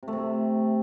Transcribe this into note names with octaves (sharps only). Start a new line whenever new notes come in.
C3
A3
C3